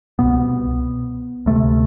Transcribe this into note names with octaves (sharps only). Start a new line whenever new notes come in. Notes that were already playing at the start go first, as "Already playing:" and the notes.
C2 B2 B3
D2 C3 A3